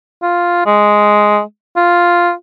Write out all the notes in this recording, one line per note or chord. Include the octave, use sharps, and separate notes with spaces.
F4
G#3
F4